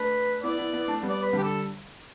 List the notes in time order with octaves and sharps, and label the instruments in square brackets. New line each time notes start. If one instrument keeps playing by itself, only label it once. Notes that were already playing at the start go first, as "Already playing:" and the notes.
Already playing: [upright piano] A3 D4 [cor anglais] B4
[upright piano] B3 E4 [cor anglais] D5
[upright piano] B3 E4
B3 E4
A3 D4
G3 B3
[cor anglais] D5
B4
[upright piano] D3 G3 [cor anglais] G4
[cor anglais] A4